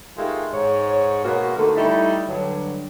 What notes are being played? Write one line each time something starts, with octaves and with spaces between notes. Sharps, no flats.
D#3 G#3 A3 F4 G4 A4
G#2 C#5
B2 G#3 A#3 F#4
D3 D#3 A3
G3 A3 D#4 E4
G2 D3 F#3